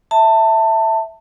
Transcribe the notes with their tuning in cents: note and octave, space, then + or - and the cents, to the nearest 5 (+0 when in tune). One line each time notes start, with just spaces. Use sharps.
E5 -5 A5 +25